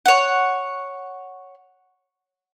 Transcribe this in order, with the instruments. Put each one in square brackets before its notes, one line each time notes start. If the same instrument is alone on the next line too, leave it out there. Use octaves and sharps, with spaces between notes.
[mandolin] C#5 F#5